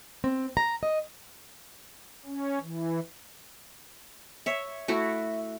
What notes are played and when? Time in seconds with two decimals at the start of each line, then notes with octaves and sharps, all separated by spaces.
0.24 C4
0.57 A#5
0.83 D#5
2.25 C#4
2.60 E3
4.46 C#5 E5
4.88 A3 E4 F#4